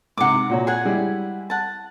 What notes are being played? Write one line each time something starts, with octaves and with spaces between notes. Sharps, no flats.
G#2 C3 F#5 D6
A#2 F#4 C#5
G#4 F#5 G#5
G3 G#3 E4
F#5 A5